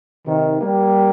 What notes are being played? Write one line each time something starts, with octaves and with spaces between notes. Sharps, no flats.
C3 D#3
G3 A#3